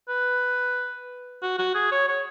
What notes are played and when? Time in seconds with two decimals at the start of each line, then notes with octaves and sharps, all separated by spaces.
0.09 B4
1.42 F#4
1.59 F#4
1.75 G#4
1.92 C#5
2.08 C#5